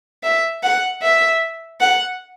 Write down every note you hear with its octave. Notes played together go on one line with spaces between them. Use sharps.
E5
F#5
E5
F#5